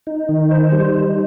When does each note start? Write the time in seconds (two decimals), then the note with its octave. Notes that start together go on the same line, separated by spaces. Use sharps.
0.07 D#4
0.29 D#3
0.51 C5
0.72 G3
0.94 D#4